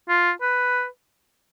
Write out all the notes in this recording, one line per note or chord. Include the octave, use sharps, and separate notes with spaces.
F4
B4